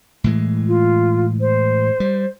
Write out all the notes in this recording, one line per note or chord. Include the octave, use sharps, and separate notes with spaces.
A2 E3 G#3
F4
C5
G3